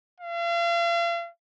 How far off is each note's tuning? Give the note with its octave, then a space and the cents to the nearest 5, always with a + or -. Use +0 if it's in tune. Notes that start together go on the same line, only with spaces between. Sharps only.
F5 -40